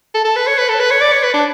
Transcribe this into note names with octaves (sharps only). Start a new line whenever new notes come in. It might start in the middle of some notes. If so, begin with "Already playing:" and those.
A4
A4
B4
C#5
B4
A4
B4
C#5
D5
C#5
B4
D4